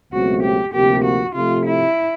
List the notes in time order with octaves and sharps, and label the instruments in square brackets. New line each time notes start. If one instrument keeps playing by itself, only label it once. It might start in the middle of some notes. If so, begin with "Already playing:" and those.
[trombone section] C#2 B2 F#3 A3 C4 [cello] F#4
[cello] G4
[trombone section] D2 C3 F3 A#3 [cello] G4
[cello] F#4
[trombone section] C3 F3 A3 [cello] F4
[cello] E4